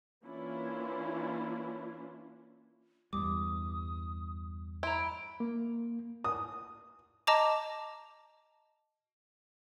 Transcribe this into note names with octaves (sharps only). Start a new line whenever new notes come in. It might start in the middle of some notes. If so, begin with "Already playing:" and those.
E3 A#3 C#4 D4 E4 F4
E2 G2 G3 D6 D#6
E4 A#5 C6 D7
A#3
D#6
D#5 A5 A#5 D6